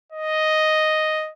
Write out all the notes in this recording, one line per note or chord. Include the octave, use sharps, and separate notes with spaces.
D#5